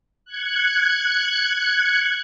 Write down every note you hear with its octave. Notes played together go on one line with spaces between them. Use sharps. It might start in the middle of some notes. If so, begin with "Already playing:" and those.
F#6 G#6 C#7